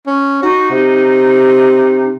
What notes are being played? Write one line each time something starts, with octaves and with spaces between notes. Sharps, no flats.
C#4
D#4 F#4
C3